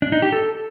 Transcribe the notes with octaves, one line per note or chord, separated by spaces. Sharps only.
D4
D#4
G4
A4